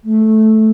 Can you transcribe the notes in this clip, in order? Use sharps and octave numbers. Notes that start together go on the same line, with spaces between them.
A3